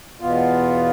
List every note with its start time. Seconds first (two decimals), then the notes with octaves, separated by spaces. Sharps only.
0.20 E2 B2 B3 F4